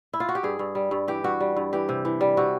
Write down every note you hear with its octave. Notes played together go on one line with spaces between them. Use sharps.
E4
F4
F#4
G4
G2 G#4
G2
G3
G2
E3 G4
G2 F#4
G3
G2
E3 G4
C3
E3
G3
C3 F#4